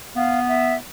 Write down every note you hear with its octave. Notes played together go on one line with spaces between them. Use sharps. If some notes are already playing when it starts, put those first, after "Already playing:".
B3 F5
E5